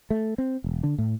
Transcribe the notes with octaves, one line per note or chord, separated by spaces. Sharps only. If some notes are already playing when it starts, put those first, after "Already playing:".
A3
C4
E1
D3
A2